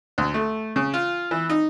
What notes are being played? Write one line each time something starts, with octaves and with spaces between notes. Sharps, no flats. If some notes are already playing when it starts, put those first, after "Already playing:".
D2
A3
C#3
F4
E3
D#4